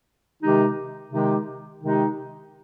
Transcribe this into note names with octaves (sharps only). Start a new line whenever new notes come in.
C3 D#3 G#3 D#4 G4
C3 D#3 G#3 D#4 G4
C3 D#3 G#3 D#4 G4